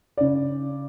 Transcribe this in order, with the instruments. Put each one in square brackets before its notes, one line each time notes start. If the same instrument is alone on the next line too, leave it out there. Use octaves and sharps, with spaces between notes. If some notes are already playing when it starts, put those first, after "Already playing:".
[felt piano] C#3 D5